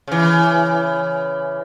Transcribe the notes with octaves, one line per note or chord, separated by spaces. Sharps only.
C#3 E3